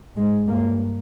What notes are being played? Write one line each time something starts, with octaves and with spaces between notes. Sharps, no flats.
G#2 G#3
G2 A#3